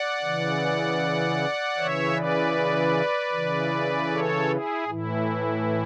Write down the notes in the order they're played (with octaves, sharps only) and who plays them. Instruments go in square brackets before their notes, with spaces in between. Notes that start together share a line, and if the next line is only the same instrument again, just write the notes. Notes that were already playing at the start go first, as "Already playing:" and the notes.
Already playing: [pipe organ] D5 F#5
C#3 E3
C#3 E3 C#5 E5
B4 D5
C#3 E3
A4 C#5
E4 G#4
A2 E3 E4